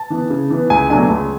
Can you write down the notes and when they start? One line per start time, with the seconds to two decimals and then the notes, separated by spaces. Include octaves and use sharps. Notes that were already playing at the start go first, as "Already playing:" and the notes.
Already playing: A5
0.10 E3 B3
0.30 C#3
0.50 E3 B3
0.70 C#2 G#5
0.90 B2 F#3 A3 D4 G#5
1.10 C#2